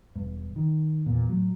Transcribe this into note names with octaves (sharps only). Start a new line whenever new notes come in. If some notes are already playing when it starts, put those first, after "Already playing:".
E1 G2
D#3
E2 A#2
A2 F#3